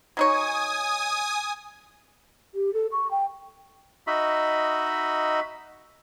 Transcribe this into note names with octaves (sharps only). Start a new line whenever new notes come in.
F#3 D#4 C#5 G#5 D#6
G4
A4
C#6
G5
D#4 F#4 D#5 E5 B5